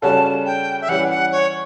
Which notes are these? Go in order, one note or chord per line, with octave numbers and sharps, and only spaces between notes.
C#3 G3 C#4 F#4 A4 A5
G5
E5
E3 G3 C#4 F#5
F#5
C#5